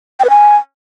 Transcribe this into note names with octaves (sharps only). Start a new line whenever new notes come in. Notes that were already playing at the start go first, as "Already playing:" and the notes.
G5
B4
G#5